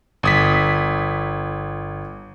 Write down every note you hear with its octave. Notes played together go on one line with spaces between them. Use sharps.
G1 D#6 B6